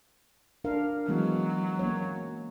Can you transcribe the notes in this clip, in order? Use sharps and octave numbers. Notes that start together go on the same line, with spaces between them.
D4 A#4 F5
E3 F#3 G#3 B3
A#3 C#4 C#5